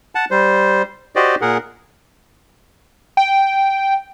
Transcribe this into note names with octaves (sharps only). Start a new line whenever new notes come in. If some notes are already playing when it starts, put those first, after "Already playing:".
F#5 A5
G3 C5
F#4 G4 C5 D5 D#5
A#2 G#4 A#4 F#5
G5